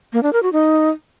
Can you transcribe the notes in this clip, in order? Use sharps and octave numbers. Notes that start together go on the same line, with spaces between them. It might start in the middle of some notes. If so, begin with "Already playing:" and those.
A#3
D4
A#4
F#4
D#4